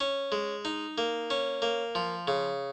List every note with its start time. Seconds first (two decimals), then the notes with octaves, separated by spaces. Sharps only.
0.01 C#4
0.32 G#3
0.65 D#4
0.98 A#3
1.30 C#4
1.62 A#3
1.95 F3
2.28 C#3